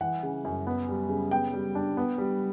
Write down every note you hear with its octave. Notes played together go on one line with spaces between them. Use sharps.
E3 F#5
C#3
F#2
B3
G3
C#3
B3 G5
G3
D4
B3
G3